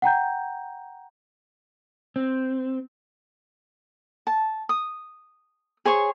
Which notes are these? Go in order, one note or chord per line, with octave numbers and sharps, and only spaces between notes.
F#5 G5 A#5 G6
C4
A5
D#6
G#4 C5 C#5 C#6